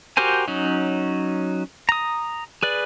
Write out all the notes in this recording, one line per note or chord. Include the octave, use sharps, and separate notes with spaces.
F#4 G4 A#4 C5 G#5
F#3 C#4 D#4
A#5 D#6
G#4 B4 D5